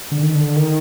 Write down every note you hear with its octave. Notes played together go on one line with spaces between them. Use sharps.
D3
D#3
D3
D#3